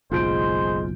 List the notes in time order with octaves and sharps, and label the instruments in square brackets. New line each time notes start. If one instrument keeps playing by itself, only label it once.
[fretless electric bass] F#1 B1 [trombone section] G#3 [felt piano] F4 G6 D7 [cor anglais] C5